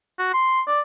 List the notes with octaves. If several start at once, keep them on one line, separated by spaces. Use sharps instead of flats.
F#4
C6
D5